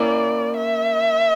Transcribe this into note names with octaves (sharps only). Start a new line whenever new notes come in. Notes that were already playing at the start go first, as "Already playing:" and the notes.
Already playing: A#3 C#4 E4 D5
E5